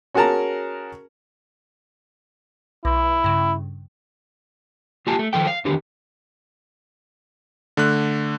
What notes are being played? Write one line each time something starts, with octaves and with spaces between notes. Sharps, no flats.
C#4 F#4 G#4 A#4 A5 A#5
B1 E4
G2 C#3
A#3 F4 G4 G#5 A5
A3
D#3 F3 A4 G5
F5
E2 D3 D#3 G4
D3 A3 F#6